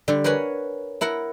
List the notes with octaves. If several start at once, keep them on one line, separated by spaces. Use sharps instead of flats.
D3 G3
A#4 B4 C#5 F#5 G#5
E4 A#4 F#5